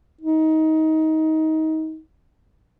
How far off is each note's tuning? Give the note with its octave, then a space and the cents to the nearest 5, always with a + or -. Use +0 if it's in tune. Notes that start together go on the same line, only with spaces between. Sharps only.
D#4 +20